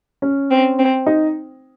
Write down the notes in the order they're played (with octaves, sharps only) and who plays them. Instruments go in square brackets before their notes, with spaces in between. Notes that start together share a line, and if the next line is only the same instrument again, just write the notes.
[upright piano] C#4
[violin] C4
C4
[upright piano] D#4